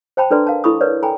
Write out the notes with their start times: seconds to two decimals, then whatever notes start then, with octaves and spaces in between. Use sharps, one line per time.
0.17 C5 G5 A5 B5
0.31 D4 A4 B4 D5 A#5 C6
0.47 A#4 F5 A5
0.64 E4 A4 B5 C#6 D#6
0.81 A#4 B4 C#5 D5
1.03 A4 G5 G#5 A#5 B5